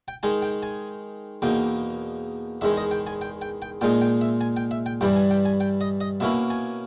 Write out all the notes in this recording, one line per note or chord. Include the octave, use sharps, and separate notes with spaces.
G5
D#3 G#3 D#4 G#5
G5
G#5
E2 B2 A#3 D#4 G5
E2 D#3 G#3 E5
D#5
G5
G#5
G5
G5
G5
A#2 G#3 D#4 G5
G5
E5
G#5
G5
E5
G5
G2 E3 G3 G5
G#5
G5
G#5
G5
D#5
D#5
B2 A#3 C#4 E4 E5
G#5